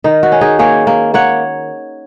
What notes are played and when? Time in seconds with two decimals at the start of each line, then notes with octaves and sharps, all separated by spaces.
0.04 D#3 D#4
0.23 F#4
0.32 C#4
0.41 D#4 G#4
0.59 A#3 G#4 C#5
0.87 A#3
1.14 A#3 C#5 F#5